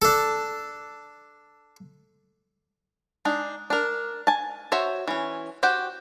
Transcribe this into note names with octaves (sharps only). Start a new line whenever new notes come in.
D4 A4
G#3 D4 D#4
D4 A#4
G#5 A5
F#4 C5 C#5 E5
E3 C#4
F#4 G4 C5 F#5 G5